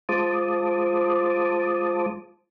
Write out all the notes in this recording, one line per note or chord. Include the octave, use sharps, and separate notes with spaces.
G#3 F4 C5 A5 D6 D#6